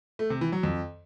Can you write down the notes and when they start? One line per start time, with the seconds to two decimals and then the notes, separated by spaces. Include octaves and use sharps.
0.19 A3
0.30 C3
0.41 E3
0.52 F#3
0.63 F2